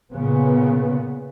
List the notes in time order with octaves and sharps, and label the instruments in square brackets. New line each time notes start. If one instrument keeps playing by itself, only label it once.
[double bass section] A#2 C#3 B3